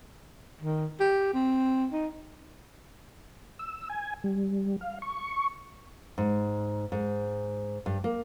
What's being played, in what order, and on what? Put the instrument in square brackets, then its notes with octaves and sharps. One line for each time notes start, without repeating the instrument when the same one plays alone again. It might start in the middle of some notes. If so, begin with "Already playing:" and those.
[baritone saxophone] D#3
G4
C4
D#4
[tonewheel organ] E6
G#5
G3
F5
C#6
[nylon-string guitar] G#2
G#2
G2
A#3